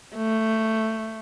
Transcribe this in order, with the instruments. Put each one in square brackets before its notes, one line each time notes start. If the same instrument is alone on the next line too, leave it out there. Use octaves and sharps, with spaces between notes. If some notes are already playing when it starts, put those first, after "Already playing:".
[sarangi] A3